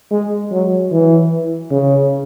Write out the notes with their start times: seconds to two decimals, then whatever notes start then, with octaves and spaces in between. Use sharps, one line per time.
0.11 G#3
0.51 F#3
0.91 E3
1.71 C#3